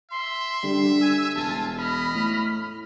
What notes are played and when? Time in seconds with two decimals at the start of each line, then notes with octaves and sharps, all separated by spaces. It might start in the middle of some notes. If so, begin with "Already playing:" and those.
0.11 E5 C6
0.63 D3 G3
1.01 G#5 E6
1.36 E1 F4 A5
1.79 D#5 B5 F6
2.15 A2